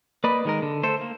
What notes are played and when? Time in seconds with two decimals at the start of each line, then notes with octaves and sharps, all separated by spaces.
0.24 A#3 B4 D5 D#5 B5
0.45 D#3 G#3 A#4
0.62 D3
0.83 A3 A4 C5
1.01 A#3